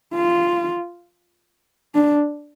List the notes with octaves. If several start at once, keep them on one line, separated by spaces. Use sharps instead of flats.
F4
D4